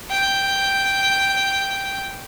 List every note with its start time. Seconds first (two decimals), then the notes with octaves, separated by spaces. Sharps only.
0.10 G5